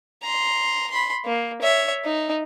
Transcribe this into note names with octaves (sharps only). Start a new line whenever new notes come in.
A#5 C6
B5 C6
A#3
C#5 E5
D#4